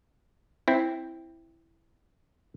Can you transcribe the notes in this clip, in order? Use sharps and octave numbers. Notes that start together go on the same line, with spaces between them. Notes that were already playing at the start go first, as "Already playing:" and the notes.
C4 E4